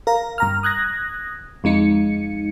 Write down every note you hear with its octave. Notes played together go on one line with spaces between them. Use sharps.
A#4 F5 A#5
G2 A#5 F6
D#6 F#6 G#6 A#6
F2 G#3 D#4 C#7